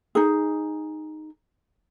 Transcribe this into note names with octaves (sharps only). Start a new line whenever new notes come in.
D#4 G#4